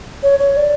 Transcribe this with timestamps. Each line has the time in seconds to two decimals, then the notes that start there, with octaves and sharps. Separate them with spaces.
0.23 C#5
0.40 C#5
0.57 D5